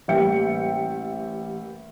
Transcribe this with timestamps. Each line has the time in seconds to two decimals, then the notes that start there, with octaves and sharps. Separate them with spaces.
0.08 A1 G3 A#3 E5 G5 C#7